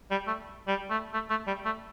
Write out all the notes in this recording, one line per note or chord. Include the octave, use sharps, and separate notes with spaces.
G3
A3
G3
A3
A3
A3
G3
A3